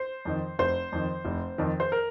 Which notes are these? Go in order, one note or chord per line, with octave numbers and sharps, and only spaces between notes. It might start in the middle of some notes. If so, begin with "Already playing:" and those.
Already playing: C5
F2 D#3
F1 C5
F2 D#3
F1
F2 D#3
C5
A#4